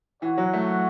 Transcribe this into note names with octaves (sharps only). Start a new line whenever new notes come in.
E3 F#4 C#5 F#5
F#3
A3